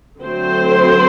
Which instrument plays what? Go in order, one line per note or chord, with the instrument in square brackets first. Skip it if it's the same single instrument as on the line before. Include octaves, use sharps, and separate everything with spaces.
[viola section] D3 F#3 A3 C4 C5